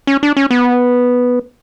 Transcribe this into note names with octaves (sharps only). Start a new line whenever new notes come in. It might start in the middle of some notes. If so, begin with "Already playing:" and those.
C#4
D4
C#4
B3